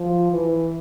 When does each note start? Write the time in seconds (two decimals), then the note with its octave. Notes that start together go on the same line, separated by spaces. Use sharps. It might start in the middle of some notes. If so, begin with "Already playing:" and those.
Already playing: F3
0.32 E3